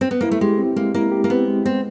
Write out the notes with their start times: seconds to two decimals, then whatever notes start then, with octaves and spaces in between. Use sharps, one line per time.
0.01 C4
0.11 B3
0.21 A#3 E4
0.31 A3
0.41 G#3 G4
0.58 C4
0.76 G#3 A#3
0.94 A#3 E4
1.12 G4
1.24 A#3
1.29 B3 C4
1.48 G#3
1.66 B3 C4